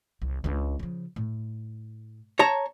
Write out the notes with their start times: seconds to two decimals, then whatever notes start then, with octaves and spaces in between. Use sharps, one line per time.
0.22 C2
0.44 C#2 D4
0.79 C#3 F3
1.16 A2
2.39 C#5 A5 A#5